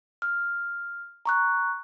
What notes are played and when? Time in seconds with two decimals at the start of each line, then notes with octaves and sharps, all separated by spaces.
0.22 F6
1.25 A#5 C#6 F#6